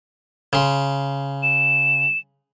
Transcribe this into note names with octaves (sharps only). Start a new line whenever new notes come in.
C#3 C6
E7